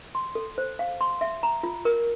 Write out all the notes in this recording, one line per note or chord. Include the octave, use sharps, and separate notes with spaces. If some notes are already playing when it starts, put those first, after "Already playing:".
C6
A4
C5
F5
C6
E5
A#5
F4
A#4